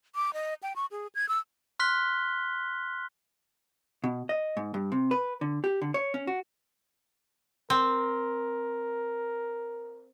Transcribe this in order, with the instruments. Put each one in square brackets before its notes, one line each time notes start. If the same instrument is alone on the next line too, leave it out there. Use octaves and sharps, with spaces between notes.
[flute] D6
D#5
G5
C#6
G#4
G#6
E6
[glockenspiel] C6 F6 F#6 B6 G7
[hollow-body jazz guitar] B2
D#5
G#2
G2
C3
B4
D3
G4
D3
C#5
C#4
F#4
[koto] C4 [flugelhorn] A#4